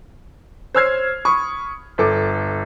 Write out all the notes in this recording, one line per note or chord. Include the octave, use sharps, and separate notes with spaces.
C5 C#5 E6 F6 G#6 C7
B5 C#6 D#6
G1 A4 D6